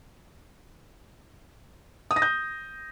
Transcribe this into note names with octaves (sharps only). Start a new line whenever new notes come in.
D#6
A#6
G6